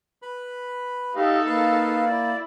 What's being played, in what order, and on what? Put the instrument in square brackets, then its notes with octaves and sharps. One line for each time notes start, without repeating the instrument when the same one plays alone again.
[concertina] B4 B5
[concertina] A3 D#5 [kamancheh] D#4 A4 [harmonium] G4 F5
[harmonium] A#3 [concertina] B4 F5
[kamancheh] E4 [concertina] D5